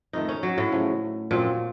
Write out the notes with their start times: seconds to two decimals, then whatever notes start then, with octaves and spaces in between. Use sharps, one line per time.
0.13 F2 D#3 A3 D#4
0.28 C#4
0.43 F#3
0.58 A2
0.72 C#3 F3 A3
1.31 F#2 A#2 F3 C4 F4